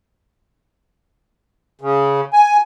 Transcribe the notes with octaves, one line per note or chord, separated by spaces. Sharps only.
C#3
G#5